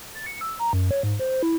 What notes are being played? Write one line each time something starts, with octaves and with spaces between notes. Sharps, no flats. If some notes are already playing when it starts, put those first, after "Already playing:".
A6
C#7
E6
A#5
F#2
C#5
G#2
C5
E4